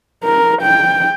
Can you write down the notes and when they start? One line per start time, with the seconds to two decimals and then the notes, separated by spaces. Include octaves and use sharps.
0.25 A#4
0.62 G5